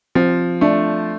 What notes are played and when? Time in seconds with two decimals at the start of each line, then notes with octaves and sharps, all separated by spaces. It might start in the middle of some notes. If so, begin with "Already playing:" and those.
0.15 F3 C4
0.61 A3 D4